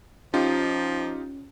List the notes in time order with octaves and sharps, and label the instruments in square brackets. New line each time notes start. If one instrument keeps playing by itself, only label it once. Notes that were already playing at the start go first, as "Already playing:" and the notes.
[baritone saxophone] F3 [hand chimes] C#4 [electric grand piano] D#4 F4 G4